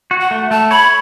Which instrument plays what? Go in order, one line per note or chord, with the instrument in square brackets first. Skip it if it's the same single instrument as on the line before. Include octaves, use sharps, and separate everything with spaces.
[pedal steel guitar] F#4
[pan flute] F#5
[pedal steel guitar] A3
[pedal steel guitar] A3 [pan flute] A5
[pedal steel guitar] C#5 [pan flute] B5